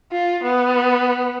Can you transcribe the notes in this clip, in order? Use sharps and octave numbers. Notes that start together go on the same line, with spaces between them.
F4
B3